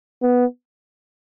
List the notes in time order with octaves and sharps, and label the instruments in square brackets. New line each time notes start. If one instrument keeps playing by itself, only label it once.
[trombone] B3